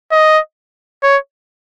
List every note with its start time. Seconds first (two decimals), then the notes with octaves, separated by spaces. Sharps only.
0.12 D#5
1.03 C#5